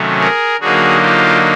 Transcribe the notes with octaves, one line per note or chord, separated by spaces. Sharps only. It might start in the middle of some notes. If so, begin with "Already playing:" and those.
Already playing: C3 D#3 F#3 A3 C#4
G#4 A#4
D3 F#3 A#3 D#4 F#4 G#4
F4 G4